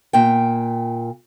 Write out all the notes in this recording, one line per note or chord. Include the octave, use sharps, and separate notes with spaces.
A#2 G5